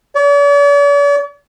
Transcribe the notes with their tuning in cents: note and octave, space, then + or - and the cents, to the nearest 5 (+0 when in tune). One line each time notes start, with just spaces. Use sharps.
D5 -45